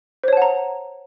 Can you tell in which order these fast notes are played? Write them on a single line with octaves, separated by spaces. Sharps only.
C5 C#5 A5 F#5 A#5